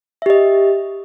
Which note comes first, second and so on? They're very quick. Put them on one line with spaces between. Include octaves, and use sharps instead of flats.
E5 G4 D#5